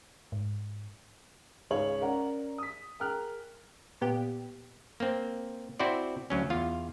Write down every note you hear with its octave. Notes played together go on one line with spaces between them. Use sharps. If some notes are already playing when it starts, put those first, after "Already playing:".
G#2
G#1 C#2 G#4 C#5 F5 F#7
C#4 A#4 D5 F#5
D#6 B6
G#4 A#4 G5 F6 F#6
A#2 B3 G4
A#3 C4
C4 E4 F#4 C5 D5
D2 F#3 C#4
E2 F4 F5